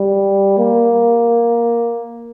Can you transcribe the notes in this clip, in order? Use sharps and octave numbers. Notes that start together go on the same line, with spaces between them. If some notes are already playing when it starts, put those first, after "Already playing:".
Already playing: G3
A#3